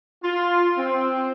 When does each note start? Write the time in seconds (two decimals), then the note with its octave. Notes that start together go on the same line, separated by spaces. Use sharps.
0.23 F4
0.78 C4